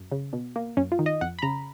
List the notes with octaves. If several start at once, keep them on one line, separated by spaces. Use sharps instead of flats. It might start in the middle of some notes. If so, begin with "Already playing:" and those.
Already playing: F#2
C#3
B2
A#3
F#2 C#4
F4
D#3
D#5
F2 F#5
B5
C#3 A#5